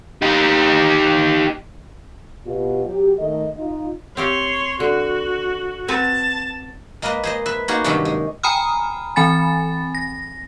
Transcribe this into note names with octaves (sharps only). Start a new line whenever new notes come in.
D#4 G4
B2 F4 G4
F#3 G4
D#3 A3 D#5
D#4 F4
C4 G4 C#5 F5 C6
D3 F#4
C4 F#4 B4 A5
G#3 A#3 A#4 B4 D#5
G#4 C5 D#5
B4 E5
A#3 B3 C#4 D#4 F#4 G#4
G2 C3 D#3 F#3 C#4 G4
G#3
G5 G#5 A#5 B5 D#6 F6
E3 C4 G#5 B5 A6
A#6